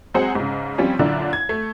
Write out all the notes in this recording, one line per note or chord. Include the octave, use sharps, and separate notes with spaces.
F#3 G#3 C4 G#4 C5 F#5
G#2 C#3
F3 G3 C4 C#4
F#2 A#2 D3 D4 E4
G#6
A3